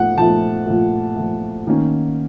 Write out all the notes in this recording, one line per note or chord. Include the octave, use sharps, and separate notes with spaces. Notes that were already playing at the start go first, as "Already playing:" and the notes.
Already playing: A#2 F3 A3 F#5
A#2 F3 A3 A5
A#2 F3 A3
A#2 F3 A3
D#3 A#3 C#4